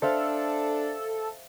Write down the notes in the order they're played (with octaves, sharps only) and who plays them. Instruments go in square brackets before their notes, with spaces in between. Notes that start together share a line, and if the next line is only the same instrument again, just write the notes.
[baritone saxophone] D4 [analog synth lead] A4 [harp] C5 E5 F5